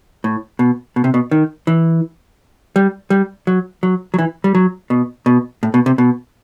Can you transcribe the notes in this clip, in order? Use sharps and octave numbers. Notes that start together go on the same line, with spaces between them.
A2
B2
B2
C3
B2
D#3
E3
G3
G3
F#3
F#3
F#3
E3
G3
F#3
B2
B2
A2
B2
C3
B2